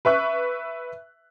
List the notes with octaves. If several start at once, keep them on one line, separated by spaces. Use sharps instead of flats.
B4 E5 C#6 F#6